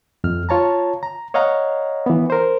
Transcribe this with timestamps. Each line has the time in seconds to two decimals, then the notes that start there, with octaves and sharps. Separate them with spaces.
0.24 F2 F6
0.49 F4 C#5 A5 A#5
1.03 A#5
1.34 C#5 D#5 F5 F#5 A#5
2.06 E3 B3
2.30 A#4 C5